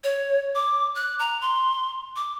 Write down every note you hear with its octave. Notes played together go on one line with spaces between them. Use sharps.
C#5
D6
F#6
A#5
C6
D6